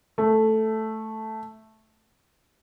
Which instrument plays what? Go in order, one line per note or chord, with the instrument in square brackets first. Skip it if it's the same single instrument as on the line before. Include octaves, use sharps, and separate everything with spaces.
[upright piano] A3